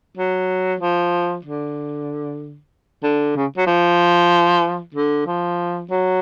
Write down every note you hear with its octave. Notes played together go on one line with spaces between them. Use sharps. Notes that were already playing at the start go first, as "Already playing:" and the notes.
F#3
F3
D3
D3
C#3
F#3
F3
D3
F3
F#3